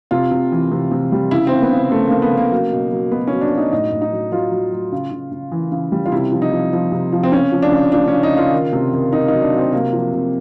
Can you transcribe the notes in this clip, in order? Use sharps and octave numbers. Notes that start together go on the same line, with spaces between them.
C3 F4
C3
E3
C3
C3
G3
C#3 E4
C#3 C4
B3
C#3
C#3 A3
A#3
C#3
B3
C#3 A#3
F#3
B2
F#3
B2 B3
F#3 C#4
D4
F#3 D#4
A2 D#4
A2
D#4
F#3
F#3 F4
F#3
F#3
C#3
C#3
C#3
E3
C#3
G3
F4
C3 E4
F3
D#4
F3
F3
C3
F3
C4
C#3 C#4
F3
D4
C#3
F3 D4
C#3 C#4
D#4
C#3 F4
D#3
C3
D#3
D#3 D#4
F#3 D#4
D4
F#3
C4
C3 A#3
F3
C3